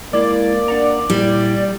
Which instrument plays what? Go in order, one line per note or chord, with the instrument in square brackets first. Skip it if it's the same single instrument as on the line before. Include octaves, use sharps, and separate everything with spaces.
[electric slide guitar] G#3 E4 F5 [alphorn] A#3 [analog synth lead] D5
[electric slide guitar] D4 F#5 A#5
[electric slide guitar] A#2 E4 [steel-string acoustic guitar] G3